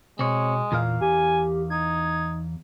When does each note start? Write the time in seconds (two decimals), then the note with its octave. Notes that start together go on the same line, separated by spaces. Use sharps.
0.19 B2 G#3 C4 C#5
0.72 E2 A#2 A#4 F5
1.01 G4 G#5
1.70 D#4 G#6